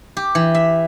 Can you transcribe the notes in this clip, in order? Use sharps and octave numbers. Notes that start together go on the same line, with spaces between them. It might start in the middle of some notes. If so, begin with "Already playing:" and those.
G4
E3
E5